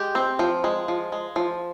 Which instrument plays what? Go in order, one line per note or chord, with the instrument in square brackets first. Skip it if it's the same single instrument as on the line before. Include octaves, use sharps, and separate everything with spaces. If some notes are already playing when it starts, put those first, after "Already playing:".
Already playing: [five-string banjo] G#3 G4
C4
F3
G#3
F3
G#3
F3